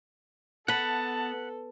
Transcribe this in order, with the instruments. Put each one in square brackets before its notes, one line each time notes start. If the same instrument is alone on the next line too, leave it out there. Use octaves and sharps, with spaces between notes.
[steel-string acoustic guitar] B3 [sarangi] A4 [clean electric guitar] F#5 B5 [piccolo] A5